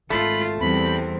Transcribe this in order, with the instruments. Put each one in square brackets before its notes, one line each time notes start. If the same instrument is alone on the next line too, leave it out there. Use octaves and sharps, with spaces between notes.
[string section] G#1 [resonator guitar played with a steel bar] A3 [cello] F4 [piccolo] B5
[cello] E2 [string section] G3 C4 [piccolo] B5